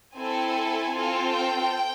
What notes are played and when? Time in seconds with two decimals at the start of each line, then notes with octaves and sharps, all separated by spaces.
0.16 C4 E4 A4 G#5
0.92 C4 F4 A4
1.30 G5